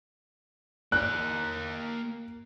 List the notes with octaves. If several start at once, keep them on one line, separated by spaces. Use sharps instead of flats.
A#3 G5 F#6